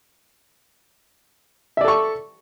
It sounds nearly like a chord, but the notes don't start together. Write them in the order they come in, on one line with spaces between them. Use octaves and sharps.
E5 D5 A4 C#6